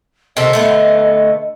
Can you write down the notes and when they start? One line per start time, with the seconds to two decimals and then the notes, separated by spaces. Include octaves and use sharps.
0.37 C3 D#3 A4 D#5
0.53 D3 A3 B3